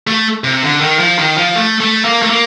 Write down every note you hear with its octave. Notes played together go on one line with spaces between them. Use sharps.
A3
C3
D3
D#3
F3
D#3
F3
A3
A3
A#3
A3
A#3